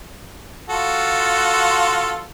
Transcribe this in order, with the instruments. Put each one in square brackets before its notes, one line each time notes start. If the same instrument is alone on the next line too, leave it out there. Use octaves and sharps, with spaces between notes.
[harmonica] F4 F#4 A4